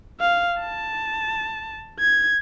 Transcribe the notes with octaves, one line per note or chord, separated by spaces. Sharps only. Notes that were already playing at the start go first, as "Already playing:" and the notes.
F5
A5
G#6